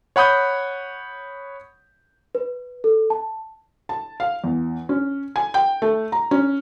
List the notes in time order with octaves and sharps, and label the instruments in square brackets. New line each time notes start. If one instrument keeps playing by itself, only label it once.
[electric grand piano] C#5 F#5 B5 D#6 G6
[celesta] B4
A4
A5
[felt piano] A5
F5
E2
C#4
G#5
G5
A3
A#5
C#4